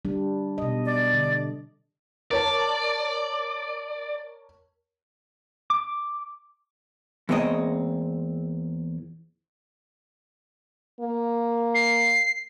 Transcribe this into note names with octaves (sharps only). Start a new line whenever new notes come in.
G3 D4
B2 D#5
D5
D3
A#4 C#5 D5 A5
D6
E2 A#2 G#3 C4 C#5 D#5
A#3
C7